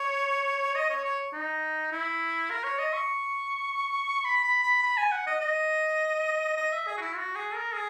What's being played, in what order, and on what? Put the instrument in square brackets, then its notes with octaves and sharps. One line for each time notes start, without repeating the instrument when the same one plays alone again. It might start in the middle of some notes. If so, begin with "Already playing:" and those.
Already playing: [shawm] C#5
D#5
C#5
C#5
D#4
E4
A#4
C#5
D#5
C#6
B5
B5
B5
B5
G#5
F#5
D#5
D#5
D#5
E5
G#4
F#4
E4
F#4
G#4
A#4
G#4